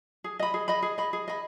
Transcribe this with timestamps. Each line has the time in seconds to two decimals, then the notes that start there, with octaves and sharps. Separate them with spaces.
0.24 G#4
0.39 D#5 B5
0.54 G#4
0.68 D#5 B5
0.82 G#4
0.98 D#5 B5
1.13 G#4
1.28 D#5 B5